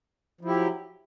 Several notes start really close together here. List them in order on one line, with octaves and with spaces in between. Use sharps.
F3 E4 G4 F#3